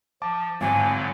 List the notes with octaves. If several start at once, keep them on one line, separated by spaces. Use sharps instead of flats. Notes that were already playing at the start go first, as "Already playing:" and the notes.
F3 A5 D6
G#1 A2 D3 F#3 G#5